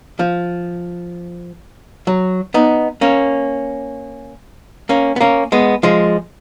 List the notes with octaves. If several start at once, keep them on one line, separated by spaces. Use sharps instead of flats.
F3
F#3
B3 D#4
A#3 C#4
A#3 C#4
B3
A#3 C#4
G#3 B3
F3 G#3